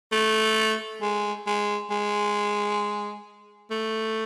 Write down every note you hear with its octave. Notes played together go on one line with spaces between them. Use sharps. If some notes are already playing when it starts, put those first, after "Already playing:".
A3
G#3
G#3
G#3
A3